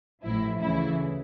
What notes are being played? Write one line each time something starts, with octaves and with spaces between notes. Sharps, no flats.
A1 A2 F3 E4
D2 C#3 E3 E4